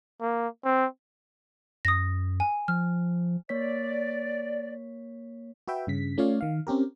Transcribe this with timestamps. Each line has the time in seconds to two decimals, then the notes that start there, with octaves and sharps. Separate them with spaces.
0.21 A#3
0.65 C4
1.85 F#2 D#6 A#6
2.40 G#5
2.68 F3 F6
3.49 A#3 C#5 D5 B6
5.68 F#4 B4 E5 G5
5.87 G2 C#3 B6
6.18 A3 C#4 F4 C#5 D5 F5
6.41 D#3 F5
6.67 C4 C#4 G4 A#4